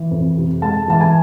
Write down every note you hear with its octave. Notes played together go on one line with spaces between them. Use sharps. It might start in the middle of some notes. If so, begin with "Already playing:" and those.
Already playing: E3
F2
C3
G#3 A5
E3 A5
G#5